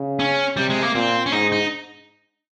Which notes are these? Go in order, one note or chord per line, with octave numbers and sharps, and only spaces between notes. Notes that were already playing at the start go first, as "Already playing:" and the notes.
Already playing: C#3
C#4
C3 G3
G#3
A#3
A#2 C4
C#4
G#2 D#4
D#4